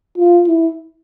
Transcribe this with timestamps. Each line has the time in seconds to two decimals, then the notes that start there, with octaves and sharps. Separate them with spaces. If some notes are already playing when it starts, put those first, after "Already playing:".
0.18 F4
0.47 E4